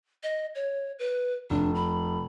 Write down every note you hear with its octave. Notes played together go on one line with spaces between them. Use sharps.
D#5
C#5
B4
F1 D4
B5